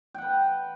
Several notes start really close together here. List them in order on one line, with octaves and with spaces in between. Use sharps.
G5 F#5 B4